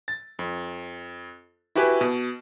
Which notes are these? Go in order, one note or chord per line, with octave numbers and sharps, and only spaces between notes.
A6
F2
E4 F#4 G4 B4 G#5
B2